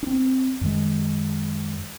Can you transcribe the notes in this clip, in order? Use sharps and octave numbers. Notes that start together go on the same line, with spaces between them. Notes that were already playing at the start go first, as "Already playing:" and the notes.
C4 D4
F#2 D#3 G#3